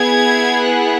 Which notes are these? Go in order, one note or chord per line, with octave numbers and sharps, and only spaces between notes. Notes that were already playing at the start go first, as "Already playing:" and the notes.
Already playing: B3 E4 G#4 G#6
F#6